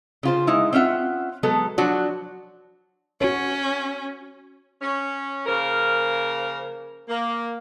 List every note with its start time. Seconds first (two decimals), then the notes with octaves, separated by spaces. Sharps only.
0.23 C#3 F4 C5
0.47 G#3 D#4 E4
0.73 C4 C#4 F4 E5 F#5
1.43 F#3 G#3 B3 A4
1.78 F3 F#3 D4 F#4
3.21 C#4 F#4 C#5
4.82 C#4
5.47 C#3 F3 A#3 A#4
7.09 A#3